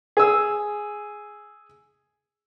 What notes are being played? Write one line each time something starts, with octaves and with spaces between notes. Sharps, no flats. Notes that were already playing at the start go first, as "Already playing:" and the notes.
G#4 E6